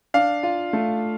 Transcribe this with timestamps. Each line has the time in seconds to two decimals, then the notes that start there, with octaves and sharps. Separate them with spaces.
0.14 D4 F5
0.43 F4
0.73 A3